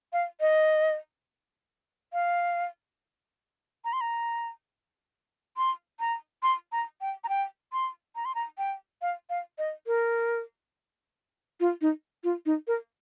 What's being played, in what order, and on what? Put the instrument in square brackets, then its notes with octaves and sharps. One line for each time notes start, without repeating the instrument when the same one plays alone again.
[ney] F5
D#5
F5
A#5
C6
A#5
C6
A#5
C6
A#5
G5
A#5
G5
C6
A#5
C6
A#5
G5
F5
F5
D#5
A#4
F4
D#4
F4
D#4
A#4